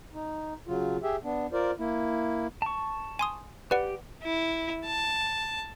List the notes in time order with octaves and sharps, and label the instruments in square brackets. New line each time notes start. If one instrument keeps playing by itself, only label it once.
[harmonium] D#4
C#3 F#3 F4
G4 G#4 E5
B3 D4
F4 A#4 C5 D5
A#3 E4
[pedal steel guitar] A5 C#6
[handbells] G#5 C6 D#6
[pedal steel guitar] G4 [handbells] B4 D5 F#5
[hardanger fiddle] E4
A5